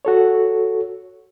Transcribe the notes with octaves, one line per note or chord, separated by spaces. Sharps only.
F#4 A4 C#5